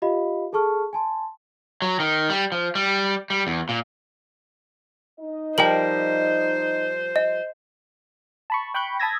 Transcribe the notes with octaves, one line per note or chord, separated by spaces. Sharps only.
F4 G4 D#5 F5 B5
G#4 A4 A5 C#6 F6
G#5 A5 C6
F#3
D#3
G3
F3
G3
G3
E2
A#2
D#4 D#5
F3 G3 A#4 C5 G5 F#7
D#5
A5 B5 C#6
G5 B5 C#6 F#6 G6
A5 B5 D#6 E6 G#6 A#6